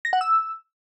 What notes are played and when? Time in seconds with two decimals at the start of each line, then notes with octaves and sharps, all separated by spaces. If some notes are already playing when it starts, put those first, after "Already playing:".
0.05 A#6
0.13 F#5
0.21 E6